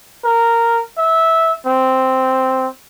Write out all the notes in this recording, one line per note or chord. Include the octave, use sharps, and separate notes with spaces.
A#4
E5
C4